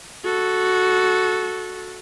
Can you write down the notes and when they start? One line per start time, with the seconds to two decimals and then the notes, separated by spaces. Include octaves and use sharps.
0.24 F#4 A4